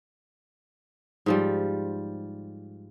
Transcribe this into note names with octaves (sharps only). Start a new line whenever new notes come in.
G#2 F3 G3